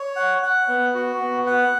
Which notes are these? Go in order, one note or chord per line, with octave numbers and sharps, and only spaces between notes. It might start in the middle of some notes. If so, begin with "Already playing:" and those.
Already playing: C#5
F#5
F#5
B3
F#4
B3
F#5